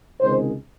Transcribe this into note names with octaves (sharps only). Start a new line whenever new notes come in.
C#2 C3 D#3 G#3 C5